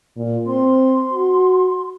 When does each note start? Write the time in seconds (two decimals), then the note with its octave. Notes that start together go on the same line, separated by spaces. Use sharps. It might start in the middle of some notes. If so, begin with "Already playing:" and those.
0.16 A#2
0.47 C4 C6
1.13 F#4